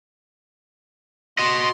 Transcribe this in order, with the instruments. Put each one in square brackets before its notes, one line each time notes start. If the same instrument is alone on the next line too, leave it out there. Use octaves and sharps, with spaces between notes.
[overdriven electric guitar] F#4 D#5 [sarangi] C6